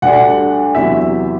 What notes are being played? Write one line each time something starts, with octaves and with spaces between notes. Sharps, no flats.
D2 D3 G3 D4 F#5
E2 C3 F#3 E5